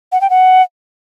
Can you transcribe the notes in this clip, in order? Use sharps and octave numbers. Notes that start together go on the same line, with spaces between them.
F#5
G5
F#5